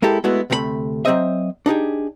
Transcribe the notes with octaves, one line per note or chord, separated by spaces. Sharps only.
G#3 A#3 E4 G4 A4
G#3 A3 B3 E4 F#4
D2 C3 A3 G#4 B5
F#3 G#3 C4 C5 D#5 E5
D4 D#4 G4 G#4